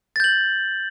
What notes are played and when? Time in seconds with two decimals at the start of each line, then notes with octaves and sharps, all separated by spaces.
0.16 A6
0.20 G6
0.24 F#7